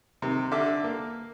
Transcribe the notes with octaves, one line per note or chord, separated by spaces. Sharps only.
C3 D#3
D3 E5 D6
A#3